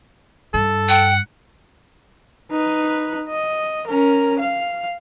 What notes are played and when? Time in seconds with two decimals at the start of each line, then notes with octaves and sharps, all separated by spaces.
0.54 G2 A4
0.89 F#5 G5
2.51 D#4 B4
3.28 D#5
3.87 C#4 A#4
4.39 F5